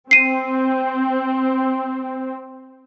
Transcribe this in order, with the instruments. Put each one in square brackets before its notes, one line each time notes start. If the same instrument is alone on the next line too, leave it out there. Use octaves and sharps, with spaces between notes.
[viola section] C4 [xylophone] C7 D#7